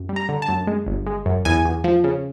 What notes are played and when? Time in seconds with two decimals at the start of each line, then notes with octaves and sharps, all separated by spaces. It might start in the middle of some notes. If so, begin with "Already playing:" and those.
Already playing: F#2
0.09 G3
0.16 A#5
0.29 D3
0.42 A5
0.48 F#2
0.67 G#3
0.87 G1
1.07 G#3
1.26 F#2
1.45 E2 G#5
1.65 E2
1.84 F3
2.04 C#3